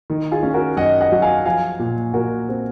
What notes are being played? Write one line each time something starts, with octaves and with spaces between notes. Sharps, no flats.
D#3
F4 G#4
C#4
F#4 A#4
F#2 D#5 F#5
D#5 F#5
F#3
F5 G#5
F3 F5 G#5
A#2
A#2 F#4 A#4
C4